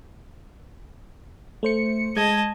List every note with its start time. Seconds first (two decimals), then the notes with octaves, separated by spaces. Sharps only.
1.63 A3 C5 C#7
2.16 G#3 D#5 A5 G#6